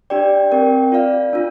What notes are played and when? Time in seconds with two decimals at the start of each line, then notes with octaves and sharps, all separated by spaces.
0.10 D4 G4 D5 G5
0.51 C4 A#4 G5
0.92 F4 D5 F5
1.33 D4 F4